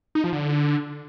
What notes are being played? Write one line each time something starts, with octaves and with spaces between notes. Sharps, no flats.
D#4
F3
D3